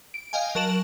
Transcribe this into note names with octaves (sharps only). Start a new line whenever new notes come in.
D7
D#5 F5 G5 G#5
F#3 A#4 A5 D7 E7 F#7